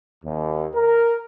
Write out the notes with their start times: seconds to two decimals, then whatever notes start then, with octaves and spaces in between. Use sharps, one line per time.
0.25 D#2
0.74 A#4